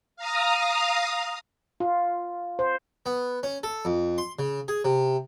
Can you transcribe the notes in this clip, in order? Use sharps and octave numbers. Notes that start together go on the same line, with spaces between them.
F5 A#5 D#6
F4
C5
B3
C#4
A4
F2
C6
C#3
G#4
C3